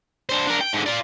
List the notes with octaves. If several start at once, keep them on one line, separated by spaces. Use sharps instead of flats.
D4 C5
D4 A#4
G5
G#2 D3
F4 D5